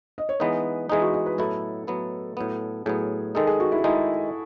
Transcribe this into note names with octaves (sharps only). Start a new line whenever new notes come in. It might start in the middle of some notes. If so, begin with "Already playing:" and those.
D#5
C#5
E3 G#3 B3 D#4 B4
E3 G#3 B3 D#4 G#4
F#4
D#5
B4
A2 F#3 B3 E4 A4
A2 F#3 B3 E4
A2 F#3 B3
A2 F#3 B3 G#4
D#3 G#3 D#4 A4
G#4
F#4
E4
D#3 G#3 D#4 E4